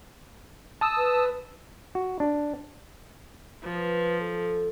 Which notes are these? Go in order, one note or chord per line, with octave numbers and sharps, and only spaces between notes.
A5 D#6 E6
B4
F#4
D4
F3 B4
A4